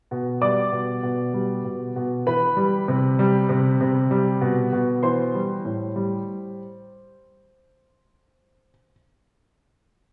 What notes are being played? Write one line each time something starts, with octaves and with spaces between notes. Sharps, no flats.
B2
G3 D5 D6
B2
B2
G3
B2
B2
E3 B4 B5
G3
C3
G3
C3
C3
G3
B2
B2
E3 C5 C6
G3
A2
G3